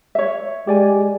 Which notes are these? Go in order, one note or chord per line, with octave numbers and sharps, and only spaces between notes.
C#5 E5
G#3 G4 D5 G#5